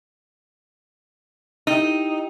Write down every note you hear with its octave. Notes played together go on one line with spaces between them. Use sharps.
D#4 E4 G4 G5